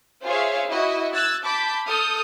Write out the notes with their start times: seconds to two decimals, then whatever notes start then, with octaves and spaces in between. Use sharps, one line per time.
0.24 F4 G#4 C5 C#5 E5 F5
0.67 E4 F#4 D#5
1.13 E6 F#6 G#6 A6
1.44 A5 B5 D6 G6 B6
1.86 A4 D#6 F6 G6